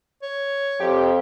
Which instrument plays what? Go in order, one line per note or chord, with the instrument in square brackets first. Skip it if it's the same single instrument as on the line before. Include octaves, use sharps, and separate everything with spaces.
[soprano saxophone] C#5
[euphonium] F2 [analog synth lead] G4